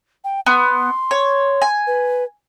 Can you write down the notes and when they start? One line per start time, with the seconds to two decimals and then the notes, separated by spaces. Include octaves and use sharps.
0.24 G5
0.46 B3 C6
1.11 C#5
1.62 G#5
1.87 B4